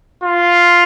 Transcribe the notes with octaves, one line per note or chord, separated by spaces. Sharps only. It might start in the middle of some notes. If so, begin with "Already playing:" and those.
F4